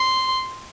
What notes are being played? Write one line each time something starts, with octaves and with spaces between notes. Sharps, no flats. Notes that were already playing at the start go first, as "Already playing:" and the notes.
Already playing: C6